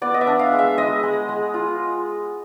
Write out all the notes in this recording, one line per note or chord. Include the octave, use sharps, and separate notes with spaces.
B3 D5
D#5
E5
D4
F5
G#3
E5
G#3 D#5
G#3
G#3
F4